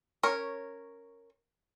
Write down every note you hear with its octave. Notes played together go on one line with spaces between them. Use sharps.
C#4 A#4 C#5